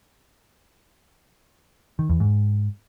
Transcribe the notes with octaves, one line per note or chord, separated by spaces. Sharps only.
D#3
E2
G#2